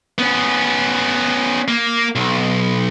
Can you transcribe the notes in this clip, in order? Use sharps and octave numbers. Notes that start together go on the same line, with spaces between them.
B3 C#4
A#3
B1